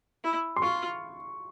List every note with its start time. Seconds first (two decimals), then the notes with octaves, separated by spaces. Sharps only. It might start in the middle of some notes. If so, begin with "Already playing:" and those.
0.24 E4
0.56 C6
0.62 F4 C#6